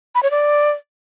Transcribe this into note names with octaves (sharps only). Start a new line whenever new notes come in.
B5
C#5
D5